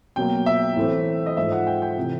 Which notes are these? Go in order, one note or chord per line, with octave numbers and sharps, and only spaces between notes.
B2 F#3 A#3 G5
E5
A2 E3 A3 C4
D#5
G#2 F3 A3 E5
F#5
G5
G5
C3 E3 A3